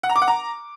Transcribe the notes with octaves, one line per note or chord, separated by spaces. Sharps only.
F#5
A#5
D6
F#5
A#5